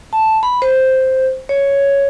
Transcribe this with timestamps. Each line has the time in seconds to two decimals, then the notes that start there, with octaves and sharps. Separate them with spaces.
0.13 A5
0.43 B5
0.62 C5
1.49 C#5